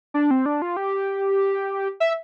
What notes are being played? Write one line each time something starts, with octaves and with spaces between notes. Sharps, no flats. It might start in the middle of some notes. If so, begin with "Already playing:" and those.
D4
C4
D4
F4
G4
E5